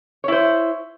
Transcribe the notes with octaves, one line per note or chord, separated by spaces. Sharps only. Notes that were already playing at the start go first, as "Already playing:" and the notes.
E4 C5 C#5